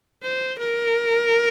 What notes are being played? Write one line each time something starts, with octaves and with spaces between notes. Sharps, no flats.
C5
A#4